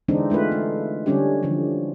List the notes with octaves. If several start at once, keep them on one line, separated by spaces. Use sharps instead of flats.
D3 E3 G#3 C4 D4 D#4
G#3 A3 F4 B4
A3
D3 G3 C#4 D4 G4
D3 E3 F3